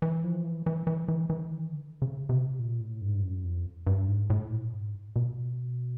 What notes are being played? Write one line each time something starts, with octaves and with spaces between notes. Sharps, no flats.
E3
F3
E3
E3
E3
E3
E3
D#3
D3
C#3
C3
A#2
A2
G2
G#2
G2
F#2
F2
G2
G#2
A2
A#2
G#2
B2